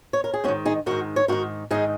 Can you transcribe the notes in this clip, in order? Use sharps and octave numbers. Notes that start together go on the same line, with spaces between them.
C#5
A#4
G#4
G#2 D#3 C#4 F#4
D#4 G#4
G#2 D#3 F#4 A#4
C#5
G#2 D#3 F#4 A#4
G#2 D#3 D#4 G#4